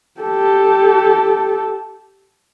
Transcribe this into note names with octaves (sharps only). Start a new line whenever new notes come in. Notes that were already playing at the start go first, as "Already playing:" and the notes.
G4 A4